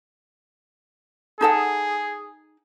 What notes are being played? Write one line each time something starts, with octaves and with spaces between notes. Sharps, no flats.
D#4 G#4 A4 F#5